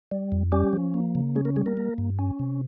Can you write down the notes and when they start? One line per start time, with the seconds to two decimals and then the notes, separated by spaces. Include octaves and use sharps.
0.11 G3
0.32 F2
0.52 G3 C#4 G4
0.73 F3
0.94 A#3
1.15 C#3
1.35 G#3 C#4 G#4
1.45 A#3 A#4
1.56 G3 G#3 G#4
1.66 A#3 A#4
1.77 A#3
1.98 G2
2.19 C#4
2.39 C3